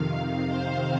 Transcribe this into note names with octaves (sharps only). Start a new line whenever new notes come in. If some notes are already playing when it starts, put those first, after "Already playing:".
Already playing: F2 C3 D#3 F5
C5